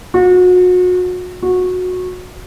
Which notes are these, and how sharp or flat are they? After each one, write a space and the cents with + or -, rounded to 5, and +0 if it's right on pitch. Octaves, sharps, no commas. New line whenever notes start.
F#4 -35
F#4 -20